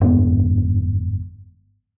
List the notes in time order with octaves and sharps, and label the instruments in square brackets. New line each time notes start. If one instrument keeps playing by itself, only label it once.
[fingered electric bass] G1 F2 G#2 B3